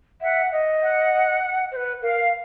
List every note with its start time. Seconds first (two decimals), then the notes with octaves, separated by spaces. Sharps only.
0.21 E5 F#5
0.52 D#5
0.81 F#5
1.72 C5
1.76 B4
2.02 A#4 F5